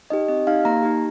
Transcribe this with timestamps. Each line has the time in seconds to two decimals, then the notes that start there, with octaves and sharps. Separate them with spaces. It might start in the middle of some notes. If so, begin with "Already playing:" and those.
0.10 D#4 G4 D#5
0.29 C4 D#5
0.47 D#4 G4 F5
0.65 A#3 A#5
0.83 D#4 G4